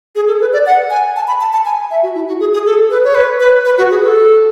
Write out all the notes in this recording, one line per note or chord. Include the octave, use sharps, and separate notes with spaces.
G#4
A4
B4
D5
F#5
G#5
A5
B5
A5
A5
G#5
E5
F#4
E4
F#4
G#4
G#4
A4
B4
C#5
B4
B4
B4
F#4
G#4
A4